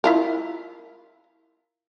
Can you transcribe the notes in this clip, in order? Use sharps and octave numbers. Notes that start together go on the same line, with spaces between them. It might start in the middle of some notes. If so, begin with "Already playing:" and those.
E4 F4 A#4